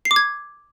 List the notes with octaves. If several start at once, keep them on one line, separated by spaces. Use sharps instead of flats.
C7
D6
G#6